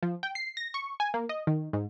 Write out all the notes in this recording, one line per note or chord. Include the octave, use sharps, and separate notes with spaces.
F3
G5
C7
A#6
C#6
G#5
A#3
D#5
D#3
G#2